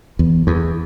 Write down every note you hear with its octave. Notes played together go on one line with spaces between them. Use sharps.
E2
E2